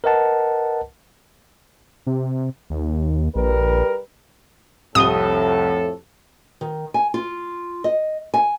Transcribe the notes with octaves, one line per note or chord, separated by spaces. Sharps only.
A#4 B4 D#5 F#5 A5
C3
D#2
A#1 G3 A#4 B4
C2 F2 A2 A4 D#6 G7
D#3
G#5
F4
D#5
G#5